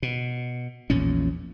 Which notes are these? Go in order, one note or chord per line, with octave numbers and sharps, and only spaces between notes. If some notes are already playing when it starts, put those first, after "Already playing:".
B2
A#1 E2 A#2 C#4